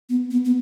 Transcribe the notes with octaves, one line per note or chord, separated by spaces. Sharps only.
B3
B3
B3